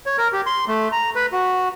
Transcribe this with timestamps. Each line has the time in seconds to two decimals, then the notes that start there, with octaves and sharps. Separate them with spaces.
0.06 C#5
0.18 A#4
0.33 G4
0.46 C6
0.68 A3
0.92 A#5
1.15 B4
1.33 F#4